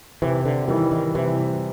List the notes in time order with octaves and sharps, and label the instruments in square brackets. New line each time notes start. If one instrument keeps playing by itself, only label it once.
[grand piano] C3 [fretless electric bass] E3
[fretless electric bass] D3
[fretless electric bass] D#3 [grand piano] E3 G3
[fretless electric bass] D#3
[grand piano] C3 [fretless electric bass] E3